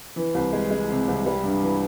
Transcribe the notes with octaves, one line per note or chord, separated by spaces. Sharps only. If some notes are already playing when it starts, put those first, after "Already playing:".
E3
C2
G#3
G#3
C3
C2
G3
G2
E3